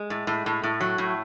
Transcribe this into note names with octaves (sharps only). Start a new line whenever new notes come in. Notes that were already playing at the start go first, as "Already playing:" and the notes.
Already playing: G#3
A2
A2
A2
A2
F#3
A2